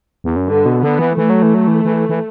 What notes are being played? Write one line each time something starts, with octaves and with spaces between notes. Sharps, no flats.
E2
F#2
G2 D3
B2
D3 B3
E3
E3 A3
F#3
E3
F#3
E3
E3
E3